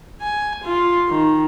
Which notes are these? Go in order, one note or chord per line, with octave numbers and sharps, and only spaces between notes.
G#5
F4
D#3